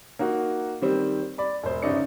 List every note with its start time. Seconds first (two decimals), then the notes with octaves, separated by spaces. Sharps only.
0.19 A#3 D#4 F#4
0.82 D#3 G3 C4
1.38 D5 B5
1.63 E1 C5
1.82 G1 C#3 D#4 D5 C#7